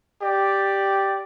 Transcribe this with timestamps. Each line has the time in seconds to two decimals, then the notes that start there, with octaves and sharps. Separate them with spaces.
0.22 G4 D5